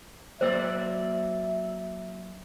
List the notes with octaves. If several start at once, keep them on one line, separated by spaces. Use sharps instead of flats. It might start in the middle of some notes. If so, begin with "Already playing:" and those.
F#3 A#3 C5 D5 E5 E6